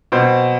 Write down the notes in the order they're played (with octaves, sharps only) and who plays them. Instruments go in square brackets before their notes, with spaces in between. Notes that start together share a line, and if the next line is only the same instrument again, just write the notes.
[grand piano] B2 C4 C5